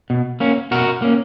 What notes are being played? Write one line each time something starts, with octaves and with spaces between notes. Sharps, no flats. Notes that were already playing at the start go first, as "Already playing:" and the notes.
B2
A#3 C#4
B2 F#4 A#4
A#3 C#4